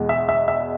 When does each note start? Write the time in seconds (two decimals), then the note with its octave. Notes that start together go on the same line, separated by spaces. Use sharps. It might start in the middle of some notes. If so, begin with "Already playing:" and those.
Already playing: E2 B2 G#3
0.09 E5
0.29 E5
0.48 E5